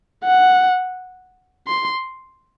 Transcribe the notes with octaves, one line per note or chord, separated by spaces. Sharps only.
F#5
C6